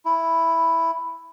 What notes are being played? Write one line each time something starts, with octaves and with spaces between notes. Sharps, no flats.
E4